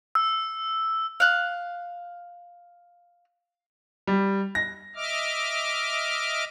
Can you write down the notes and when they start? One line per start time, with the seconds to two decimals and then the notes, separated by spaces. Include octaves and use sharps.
0.15 E6
1.20 F5 F#6
4.07 G3
4.55 A#6
4.95 D#5 E5 D6 F6